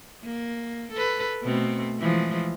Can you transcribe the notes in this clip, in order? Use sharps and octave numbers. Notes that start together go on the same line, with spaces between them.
A#3
A4 B4
B2 A3 C4
E3 F3 G#3